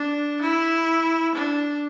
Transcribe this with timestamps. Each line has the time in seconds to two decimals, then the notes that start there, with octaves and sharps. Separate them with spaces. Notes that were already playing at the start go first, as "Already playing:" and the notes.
Already playing: D4
0.42 E4
1.35 D4